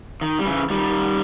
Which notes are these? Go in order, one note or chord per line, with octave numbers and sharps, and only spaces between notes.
D#3
G3
C#3 E3
D#3 G3